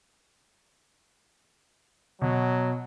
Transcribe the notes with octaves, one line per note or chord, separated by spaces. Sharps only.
B2 F#3